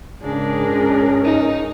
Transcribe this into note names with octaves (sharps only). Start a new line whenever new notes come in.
G#2 C#3 D4 G#4 A#4
C#2 C#4
D#4